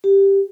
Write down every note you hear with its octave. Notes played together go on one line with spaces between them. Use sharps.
G4